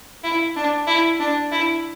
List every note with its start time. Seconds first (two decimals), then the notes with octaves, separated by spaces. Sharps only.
0.24 E4
0.56 D4
0.87 E4
1.20 D4
1.52 E4